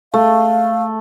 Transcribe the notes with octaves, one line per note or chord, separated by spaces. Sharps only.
A3 F5